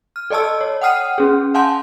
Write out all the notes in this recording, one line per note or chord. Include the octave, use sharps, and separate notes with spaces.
F6
A4 D5 D#5 A5 E6
C#5
F#5 G5 D#6 F6 C7 D#7
C#4 G#4
F5 F#5 G#5 A5 C6 G6